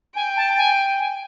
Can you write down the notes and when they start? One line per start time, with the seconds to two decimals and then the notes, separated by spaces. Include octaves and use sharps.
0.15 G5 G#5
0.36 A5
0.57 G#5
0.99 G#5